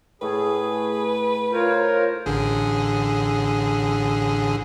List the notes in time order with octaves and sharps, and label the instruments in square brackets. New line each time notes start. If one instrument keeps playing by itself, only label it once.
[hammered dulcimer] A2 A3 [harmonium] G#4 [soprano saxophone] B4
[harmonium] F4 C5 C#5 [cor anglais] A#4
[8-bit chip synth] A1 D3 G#4